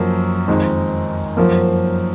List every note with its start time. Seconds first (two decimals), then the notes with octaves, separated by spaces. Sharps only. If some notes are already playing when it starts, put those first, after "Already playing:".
Already playing: F#2 F3 A#3
0.48 F2 D#3 G#3 D#4
1.37 F#2 F3 A#3